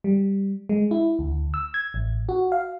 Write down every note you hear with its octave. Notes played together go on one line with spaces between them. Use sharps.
G3
G#3
E4
D2
E6
G#6
A1
F#4
F5